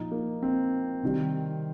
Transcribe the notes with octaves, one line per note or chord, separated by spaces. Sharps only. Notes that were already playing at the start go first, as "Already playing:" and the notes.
Already playing: A#2 F3 D#4
A#3
C4
C3 D#3 G3